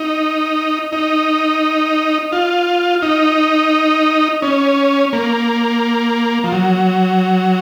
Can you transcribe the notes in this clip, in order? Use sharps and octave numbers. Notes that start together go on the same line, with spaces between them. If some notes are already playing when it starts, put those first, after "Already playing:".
Already playing: D#4
D#4
F4
D#4
C#4
A#3
F3
F#3